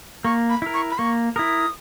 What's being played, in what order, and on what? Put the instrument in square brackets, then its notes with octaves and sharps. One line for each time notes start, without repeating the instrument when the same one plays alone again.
[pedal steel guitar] A#3 [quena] C#6
[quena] B5
[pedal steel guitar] E4 A#4
[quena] C#6
B5
[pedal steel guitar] A#3 [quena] C#6
[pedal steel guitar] E4 A#4 [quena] D#6